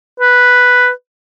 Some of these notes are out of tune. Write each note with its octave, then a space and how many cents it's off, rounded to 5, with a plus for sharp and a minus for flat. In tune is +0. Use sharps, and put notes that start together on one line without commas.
B4 +0